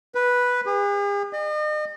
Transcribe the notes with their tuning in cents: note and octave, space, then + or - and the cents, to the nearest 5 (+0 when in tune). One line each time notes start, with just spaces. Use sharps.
B4 -5
G#4 -45
D#5 -40